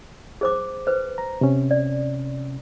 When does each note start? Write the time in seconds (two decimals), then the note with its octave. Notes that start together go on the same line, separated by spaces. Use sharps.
0.41 G#4 C5 D6
0.87 B4 C5
1.18 A#5
1.41 C3 C#4
1.71 D5